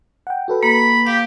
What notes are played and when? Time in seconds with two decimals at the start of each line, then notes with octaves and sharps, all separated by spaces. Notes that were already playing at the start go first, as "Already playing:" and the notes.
0.27 F#5 G5
0.48 F#4 A4 B4
0.63 A#3 B5
1.07 G4 F5